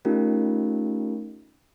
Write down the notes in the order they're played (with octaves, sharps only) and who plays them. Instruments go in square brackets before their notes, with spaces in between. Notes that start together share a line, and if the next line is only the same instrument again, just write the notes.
[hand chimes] A3 C#4 D#4 F4 G4 A#4